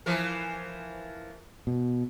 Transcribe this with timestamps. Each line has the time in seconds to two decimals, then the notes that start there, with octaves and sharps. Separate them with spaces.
0.06 E3 F3 A#4
1.67 B2